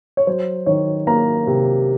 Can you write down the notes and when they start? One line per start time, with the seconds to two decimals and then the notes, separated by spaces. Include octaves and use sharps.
0.17 C#5
0.27 F#3 C5
0.66 D#3 C#5
1.07 A#3 A#5
1.47 C3